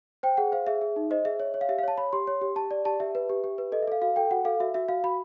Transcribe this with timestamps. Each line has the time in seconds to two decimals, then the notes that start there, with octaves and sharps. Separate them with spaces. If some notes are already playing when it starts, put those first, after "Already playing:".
0.23 C5 G5
0.37 G#4 F#5
0.52 C5 F5
0.67 G#4 E5
0.82 G#4
0.96 D#4
1.11 C5 D#5
1.25 G#4 E5
1.40 C#5
1.54 C#5
1.61 F5
1.69 G4 E5
1.79 F5
1.83 C#5 A5
1.97 C#5 B5
2.13 G4 C6
2.27 C#5
2.41 G4
2.56 G4 A5
2.71 D5
2.85 G4 A5
3.00 G4 E5
3.15 B4
3.29 G4
3.44 G4
3.58 B4
3.72 A4 D#5
3.82 E5
3.88 A4 F5
4.01 F#4 F5
4.16 A4 G5
4.31 F#4 F#5
4.45 A4 F5
4.60 F#4 E5
4.74 F#4 E5
4.89 F#4 F5
5.04 F#4 B5